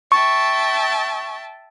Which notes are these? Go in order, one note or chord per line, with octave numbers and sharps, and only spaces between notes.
E5 G5 A5 C#6